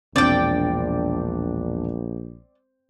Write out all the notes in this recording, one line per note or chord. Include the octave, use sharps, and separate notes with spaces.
E1 A#1 C4 D4 D5 G5